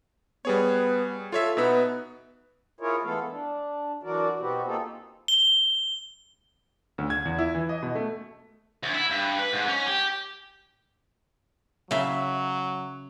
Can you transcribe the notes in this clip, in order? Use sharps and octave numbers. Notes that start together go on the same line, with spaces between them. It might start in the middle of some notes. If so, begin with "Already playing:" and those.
G3 B3 G#4 C#5
F4 A4 C#5 E5
B2 B3 D#4 E5
E4 F4 G#4 A#4 C#5
E3 G#3 A3 B3 A4 F5
D4
E3 F#3 D4 F#4 A#4 D5
B2 B3 C4 F#4 G4
A#3 C4 D#4 F4 G#4 A4
G7
D2
G#6
E2
E4
E3
D#5
B2
A3
D2
E4
G2
B4
G#2
C#4
G4
C#3 F#3 E5